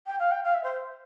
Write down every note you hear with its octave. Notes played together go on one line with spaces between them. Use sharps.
G5
F5
G5
F5
E5
C5